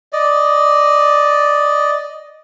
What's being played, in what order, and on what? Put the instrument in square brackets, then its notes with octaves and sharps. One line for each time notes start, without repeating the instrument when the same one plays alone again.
[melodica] D5 D#5